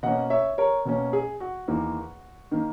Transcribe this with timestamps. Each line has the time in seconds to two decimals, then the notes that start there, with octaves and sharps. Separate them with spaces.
0.03 B2 A#3 C#4 D#5 F#5
0.30 C#5 E5
0.58 A#4 C#5
0.85 B2 A#3 C#4
1.13 G#4
1.40 F#4
1.68 E2 D#3 A#3
2.51 D#3 A#3